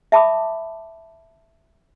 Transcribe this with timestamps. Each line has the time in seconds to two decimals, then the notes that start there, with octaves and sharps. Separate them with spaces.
0.12 E5 A5 B5 D6 D#6